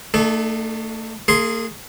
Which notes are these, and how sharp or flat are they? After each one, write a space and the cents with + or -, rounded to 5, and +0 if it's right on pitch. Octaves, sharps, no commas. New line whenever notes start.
A3 +30 D#4 -40 A4 -30
A#3 -40 G#4 +0 C6 +0